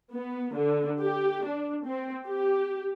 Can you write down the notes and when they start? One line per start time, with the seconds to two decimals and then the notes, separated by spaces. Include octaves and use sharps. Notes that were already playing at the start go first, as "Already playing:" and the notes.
0.12 B3
0.53 D3
1.00 G4
1.45 D4
1.86 C4
2.26 G4